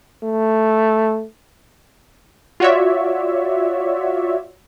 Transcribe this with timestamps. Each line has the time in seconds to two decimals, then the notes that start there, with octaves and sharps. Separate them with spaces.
0.23 A3
2.60 F4 F#4 C#5 D5 E5